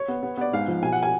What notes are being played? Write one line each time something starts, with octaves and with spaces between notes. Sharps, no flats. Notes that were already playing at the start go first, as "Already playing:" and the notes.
Already playing: C#5
B3
B3
B3 D5
G#2 F5
F3
B1 G#5
F#5
G#5